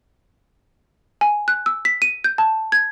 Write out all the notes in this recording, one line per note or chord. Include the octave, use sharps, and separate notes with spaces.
G#5
F#6
E6
B6
D#7
G6
A5
G#6